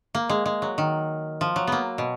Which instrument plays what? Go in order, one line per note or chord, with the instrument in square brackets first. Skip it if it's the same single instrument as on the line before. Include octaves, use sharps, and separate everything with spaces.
[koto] A#3
G#3
G#3
F#3
D#3
F3
F#3
A#3 B3
B2